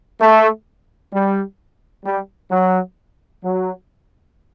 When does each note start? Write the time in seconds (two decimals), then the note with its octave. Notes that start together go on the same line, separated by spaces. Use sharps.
0.20 A3
1.13 G3
2.05 G3
2.51 F#3
3.43 F#3